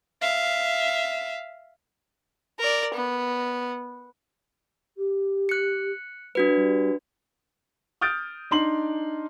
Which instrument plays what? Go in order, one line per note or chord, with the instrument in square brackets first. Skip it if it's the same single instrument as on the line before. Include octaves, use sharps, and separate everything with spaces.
[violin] E5 F5
[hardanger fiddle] A#4 D5
B3
[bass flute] G4
[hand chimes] F#6 C#7
[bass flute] G3 [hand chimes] D4 F#4 B4
[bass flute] G3
[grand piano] D#6 F6 G6 A6 D7
D4 D#4 C6 F#7